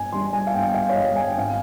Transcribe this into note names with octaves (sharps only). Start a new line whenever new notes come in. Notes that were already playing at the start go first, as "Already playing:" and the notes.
Already playing: G1 G#5
G2 G3 C6
G#5
F5
G1 G5
F5
C#5
G2 G3 D#5
G#5
G5
G#1 F5